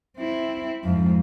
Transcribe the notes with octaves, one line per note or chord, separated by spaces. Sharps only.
C4 E4
F2 G#2